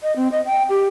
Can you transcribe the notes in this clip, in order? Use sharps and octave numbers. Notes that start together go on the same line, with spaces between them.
D#5
C4
D#5
G5
G4